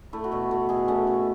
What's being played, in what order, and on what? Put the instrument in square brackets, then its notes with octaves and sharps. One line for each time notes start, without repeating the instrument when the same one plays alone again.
[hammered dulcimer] A3 E4
F#4
B2 E4
A3 F#4
B2 G#4
A3 C#4
B2